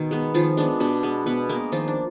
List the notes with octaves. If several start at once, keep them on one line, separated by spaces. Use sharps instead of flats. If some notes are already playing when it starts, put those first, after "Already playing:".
Already playing: B2 D#3
G#3 B3
D#3 F3 F4
G#3 B3 D4
B2 D4
G#3 B3
B2 B3 B4
G#3 A#3 B3 A#4
D#3 F3 F4
D4